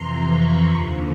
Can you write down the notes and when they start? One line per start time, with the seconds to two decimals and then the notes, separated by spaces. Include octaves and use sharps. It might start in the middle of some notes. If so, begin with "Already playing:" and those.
Already playing: F2 C3 E3 A#5 C6
0.28 B5 C#6
0.66 D#2 D3 F3